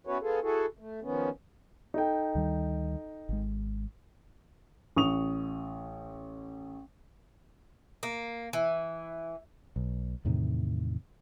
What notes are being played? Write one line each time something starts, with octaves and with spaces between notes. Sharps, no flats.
B3 C#4 E4 F#4 B4 C#5
B3 F4 G#4 A4
E4 F#4 G#4 A4
A3
D#3 F3 B3 C#4
D#4 A4 G5
D2 D#3 G3
G#1 G#3
A1 C#6 D#6 F7
A#3
E3
B1
E2 A2 C3 D#3